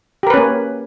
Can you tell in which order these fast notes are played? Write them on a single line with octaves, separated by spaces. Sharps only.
G4 A#4 B4 C#4 A#3